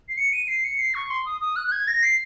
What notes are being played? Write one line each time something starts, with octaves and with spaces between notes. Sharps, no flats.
C7
C#7
D#7
C7
C#7
C7
C#6
C6
D#6
D#6
F#6
F#6
G#6
A#6
C7